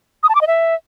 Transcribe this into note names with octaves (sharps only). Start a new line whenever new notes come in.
D#6
A5
D6
D#5
E5